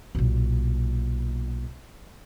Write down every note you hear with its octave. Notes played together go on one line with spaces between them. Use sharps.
B1 A#2